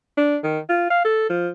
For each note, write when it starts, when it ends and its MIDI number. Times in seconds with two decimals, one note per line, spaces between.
0.18 0.37 62
0.43 0.59 51
0.69 0.87 65
0.91 1.03 77
1.05 1.25 69
1.30 1.49 53